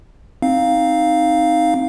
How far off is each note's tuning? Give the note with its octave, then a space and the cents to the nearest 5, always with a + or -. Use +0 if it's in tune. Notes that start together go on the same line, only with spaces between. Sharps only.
C4 +0 D#4 +0 F5 +0